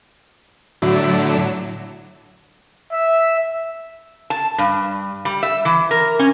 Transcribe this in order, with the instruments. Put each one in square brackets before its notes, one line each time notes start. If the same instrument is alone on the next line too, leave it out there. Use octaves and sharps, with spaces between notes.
[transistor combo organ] A2 D3 E4 [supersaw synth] F#3
[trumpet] E5
[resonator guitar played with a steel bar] A5
G2
G3
E5
E3
A#4
C#4